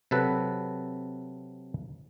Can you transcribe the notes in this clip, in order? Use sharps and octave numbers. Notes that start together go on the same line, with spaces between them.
C3 F#3 A4 B4